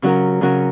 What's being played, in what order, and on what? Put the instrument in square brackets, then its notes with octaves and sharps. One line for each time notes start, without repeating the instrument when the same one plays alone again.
[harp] C#3 F#3 C#4 F#4 A#4
C#3 F#3 C#4 F#4 A#4